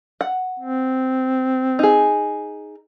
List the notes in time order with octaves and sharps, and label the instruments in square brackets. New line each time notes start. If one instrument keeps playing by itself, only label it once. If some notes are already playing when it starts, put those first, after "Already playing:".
[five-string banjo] F#5
[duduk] C4
[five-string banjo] D#4 G#4